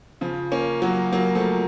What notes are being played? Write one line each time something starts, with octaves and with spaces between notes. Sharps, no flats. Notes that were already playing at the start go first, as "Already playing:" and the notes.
C#3 F3
A#3 C#4
F#3 A#3
F#3 A#3
F3 A3